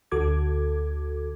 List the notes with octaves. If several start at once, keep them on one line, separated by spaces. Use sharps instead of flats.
D2 D3 F#4 A4 D6 G#6